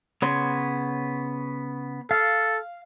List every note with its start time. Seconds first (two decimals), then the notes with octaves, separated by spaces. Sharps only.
0.22 C#3 B3 C#5 C6
2.11 A4 F5